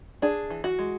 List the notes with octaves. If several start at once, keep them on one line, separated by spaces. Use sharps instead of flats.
D4 G#4
E3
F#4
G#3